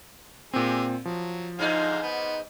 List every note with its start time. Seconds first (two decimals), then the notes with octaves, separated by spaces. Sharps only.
0.54 A#2 C4 G4 G#4
1.05 F3 F#3
1.59 G#2 D3 G#3 D#4 F5
2.02 B3